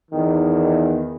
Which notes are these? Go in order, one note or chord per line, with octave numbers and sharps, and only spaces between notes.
E2 D#3